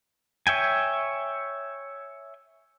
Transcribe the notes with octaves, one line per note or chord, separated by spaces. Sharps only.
C#5 E5 G5 G#5